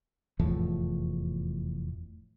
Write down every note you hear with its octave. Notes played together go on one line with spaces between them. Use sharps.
F1 E2 A2 F3